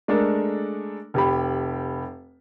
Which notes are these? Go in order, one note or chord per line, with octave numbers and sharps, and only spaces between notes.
G#3 A3 D4 A4 A#4
F1 G4 B5